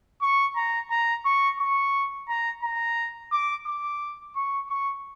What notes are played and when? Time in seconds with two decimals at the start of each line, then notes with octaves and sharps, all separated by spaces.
0.22 C#6
0.56 A#5
0.91 A#5
1.25 C#6
1.60 C#6
2.29 A#5
2.63 A#5
3.32 D6
3.67 D6
4.36 C#6
4.70 C#6